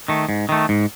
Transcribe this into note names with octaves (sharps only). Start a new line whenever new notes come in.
D#3 A3
G#2
D#3 A3
G#2